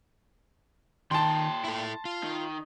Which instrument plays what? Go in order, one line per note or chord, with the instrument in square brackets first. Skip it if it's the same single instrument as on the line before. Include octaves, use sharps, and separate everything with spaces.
[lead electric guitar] A#2 G5 [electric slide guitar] D#3 [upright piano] A5 C6
[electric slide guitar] E4 A4
F4
[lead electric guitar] D#3